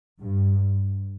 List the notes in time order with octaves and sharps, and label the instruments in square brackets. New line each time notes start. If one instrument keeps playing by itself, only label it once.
[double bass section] G2